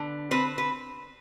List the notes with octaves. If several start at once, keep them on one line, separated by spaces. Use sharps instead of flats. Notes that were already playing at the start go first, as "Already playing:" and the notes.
Already playing: D3 B3
C4 B4
B4